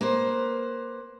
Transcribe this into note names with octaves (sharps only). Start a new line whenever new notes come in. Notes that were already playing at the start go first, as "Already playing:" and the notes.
A#3 B4 C5